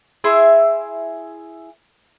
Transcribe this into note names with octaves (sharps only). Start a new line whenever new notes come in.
E4 G#4 E5 C6